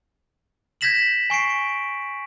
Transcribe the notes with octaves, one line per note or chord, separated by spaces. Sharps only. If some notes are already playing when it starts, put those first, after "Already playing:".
G6 G#6 A#6 B6 E7 F#7
G#5 C#6 C7 D7